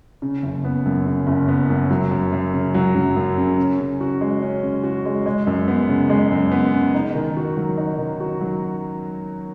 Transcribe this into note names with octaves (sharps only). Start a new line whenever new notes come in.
C#3
F#1
B3
F#2
C#3
F#1
B3
F#2
F#3
F#2
F#2
C#3
F#3
F#2
F#2
C#3
C#4
C#3
F#4
G#3
C#4
C#3
F#4
G#3
G#3
F#2
B3
C#3
G#3
F#2
B3
C#3
D#4
D#3
F#4
F#3
D#4
D#3
F#4
F#3